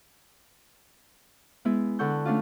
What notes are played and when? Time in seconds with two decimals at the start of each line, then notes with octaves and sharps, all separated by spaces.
1.65 G#3 B3 E4
1.99 D3 A4 F#5 C#6 E6 G6
2.25 A3 C#4 D4 F4